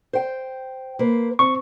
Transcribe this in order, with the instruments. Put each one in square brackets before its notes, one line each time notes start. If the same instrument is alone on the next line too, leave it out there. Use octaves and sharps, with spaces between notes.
[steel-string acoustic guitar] C5 G5
A#3 B4 C5
[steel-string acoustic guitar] C4 [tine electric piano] C#6